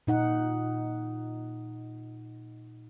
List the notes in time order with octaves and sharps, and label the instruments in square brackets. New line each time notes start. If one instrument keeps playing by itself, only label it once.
[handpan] A#2 D#4 F#5